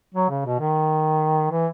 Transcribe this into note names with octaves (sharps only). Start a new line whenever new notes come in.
F#3
C#3
B2
D#3
E3